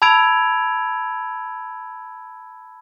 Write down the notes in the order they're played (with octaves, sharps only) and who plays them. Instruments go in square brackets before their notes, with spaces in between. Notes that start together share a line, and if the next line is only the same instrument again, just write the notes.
[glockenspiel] A5 B5 E6 G#6 D7 F7